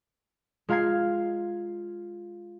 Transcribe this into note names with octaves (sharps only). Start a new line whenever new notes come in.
G#3 F4 F5 A#5 G#6 C7